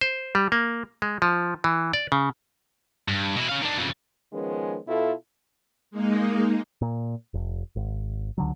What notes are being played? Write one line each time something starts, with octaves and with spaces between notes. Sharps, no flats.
C5
G3
A#3
G#3
F3
E3
D5
C#3
G2
B2 E4
C#4 F5
D#3 D4
F2 C#3
D#3 F3 G#3 B3 C#4 B4
B2 E4 F4 A4
G#3 A#3 D#4
A#2
F1
G#1
C#2 D3 F#3